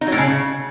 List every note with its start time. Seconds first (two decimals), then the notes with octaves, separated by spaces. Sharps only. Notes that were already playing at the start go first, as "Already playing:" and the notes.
0.01 D#4
0.07 F#3
0.12 A2
0.18 C#3